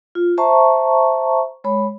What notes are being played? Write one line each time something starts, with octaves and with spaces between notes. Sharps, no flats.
F4
C5 E5 A5 A#5 C#6
G#3 C#5 B5